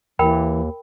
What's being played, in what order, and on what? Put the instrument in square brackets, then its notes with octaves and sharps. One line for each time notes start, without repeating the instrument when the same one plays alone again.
[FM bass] D#2 [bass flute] E3 [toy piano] A#4 G5 B5